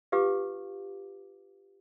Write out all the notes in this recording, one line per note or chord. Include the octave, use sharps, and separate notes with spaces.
F4 G4 B4 F5 D6